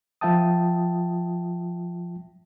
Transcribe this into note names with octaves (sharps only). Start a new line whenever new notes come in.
F3 F4 E5 G5 A5 D#6